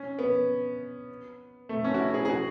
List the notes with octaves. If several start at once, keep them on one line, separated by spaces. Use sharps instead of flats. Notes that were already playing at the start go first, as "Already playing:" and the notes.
Already playing: C#4
B3
A3
C#4
F#4
E4
G#4
G#4
F#4